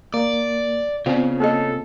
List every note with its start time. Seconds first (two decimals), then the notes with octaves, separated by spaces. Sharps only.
0.14 A#3 D5
1.06 C#3 B3 C4 F4 D5
1.40 A#3 G#4 A4 D#5